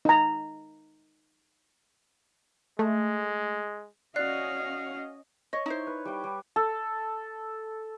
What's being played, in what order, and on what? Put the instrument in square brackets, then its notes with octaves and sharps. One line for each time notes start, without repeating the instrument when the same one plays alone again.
[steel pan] D#4 A#5
[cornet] G#3 [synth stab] A3
[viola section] C#4 D#5 [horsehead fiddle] F#4 F5 [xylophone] D5 F#6 C7
[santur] C#5 [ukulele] D#5
[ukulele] D#4 E4 C5
[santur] B4
G3 G5
G3
A4